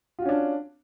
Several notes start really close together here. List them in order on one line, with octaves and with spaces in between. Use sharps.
F4 F#4 C#4 D4